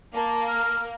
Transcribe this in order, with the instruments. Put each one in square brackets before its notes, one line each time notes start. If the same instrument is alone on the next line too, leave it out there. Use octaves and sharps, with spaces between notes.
[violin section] A#3 [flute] A5
[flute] F6